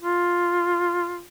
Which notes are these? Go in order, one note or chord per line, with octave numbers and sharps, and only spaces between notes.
F4